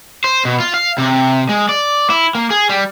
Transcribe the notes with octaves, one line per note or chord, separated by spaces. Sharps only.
C5
B2
F4
F5
C3
G#3
D5
E4
A#3
G#4
G3